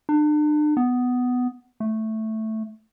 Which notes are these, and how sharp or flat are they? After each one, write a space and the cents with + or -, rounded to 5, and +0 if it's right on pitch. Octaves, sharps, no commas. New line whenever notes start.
D4 +40
B3 +10
A3 +0